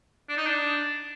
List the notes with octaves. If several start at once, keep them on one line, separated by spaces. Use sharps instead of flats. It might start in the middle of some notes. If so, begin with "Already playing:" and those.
D4
D#4
D4